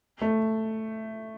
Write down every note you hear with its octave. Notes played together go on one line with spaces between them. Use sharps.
A3